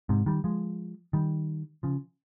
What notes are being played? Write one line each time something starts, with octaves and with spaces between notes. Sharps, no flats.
G#2 C3
D#3 G3
F3 G#3
D#3 G3
C#3 F3